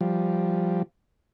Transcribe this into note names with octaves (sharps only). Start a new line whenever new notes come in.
F3 G3